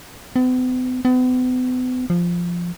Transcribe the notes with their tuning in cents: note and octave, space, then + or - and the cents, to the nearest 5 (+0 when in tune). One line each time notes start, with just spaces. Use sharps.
B3 +45
B3 +40
F3 -5